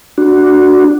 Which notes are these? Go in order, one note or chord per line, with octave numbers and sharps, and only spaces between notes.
D4 F#4